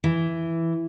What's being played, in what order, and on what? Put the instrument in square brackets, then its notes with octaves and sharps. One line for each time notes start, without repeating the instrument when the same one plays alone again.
[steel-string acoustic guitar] E3